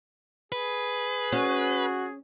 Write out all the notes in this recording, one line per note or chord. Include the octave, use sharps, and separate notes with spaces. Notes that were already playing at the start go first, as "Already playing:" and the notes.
G#4 B4
C#4 F#4